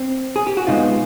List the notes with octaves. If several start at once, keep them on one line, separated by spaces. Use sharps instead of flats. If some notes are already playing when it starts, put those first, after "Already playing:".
Already playing: C4
G#4
G4
F#4
C3 E3 G#3 B3 D#4 F4